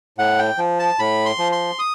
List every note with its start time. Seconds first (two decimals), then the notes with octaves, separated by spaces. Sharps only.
0.18 A2 F#5
0.39 G5
0.58 F3
0.79 A5
0.99 A2 B5
1.26 C6
1.39 F3
1.52 C6
1.79 D#6